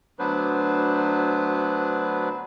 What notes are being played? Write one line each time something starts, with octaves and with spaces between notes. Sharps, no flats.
D2 F#3 B3 D4 B4 C5